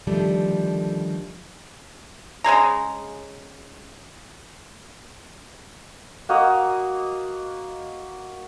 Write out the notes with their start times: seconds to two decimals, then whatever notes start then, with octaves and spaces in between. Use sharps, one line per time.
0.07 D3 D#3 F3 G3 A3
2.44 C#3 G#3 G#4 A#5
6.29 A#3 F#4 D#5 F5